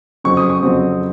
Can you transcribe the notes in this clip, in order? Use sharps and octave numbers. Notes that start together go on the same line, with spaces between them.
F2 C#3 F#3 C4 C#6
D#6
C#6
F2 C#3 F#3 C4